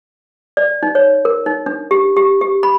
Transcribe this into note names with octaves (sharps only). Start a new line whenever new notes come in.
D5
D#4
C#5
A#4
D#4
D4
G4
G4
G4
B5